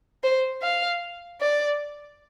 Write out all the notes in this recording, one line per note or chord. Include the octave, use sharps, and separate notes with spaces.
C5
F5
D5